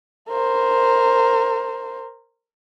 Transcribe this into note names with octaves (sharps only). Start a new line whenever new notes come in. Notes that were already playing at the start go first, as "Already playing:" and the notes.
A#4 C5